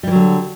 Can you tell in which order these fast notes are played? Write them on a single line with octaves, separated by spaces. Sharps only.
G3 E3 F#3 D3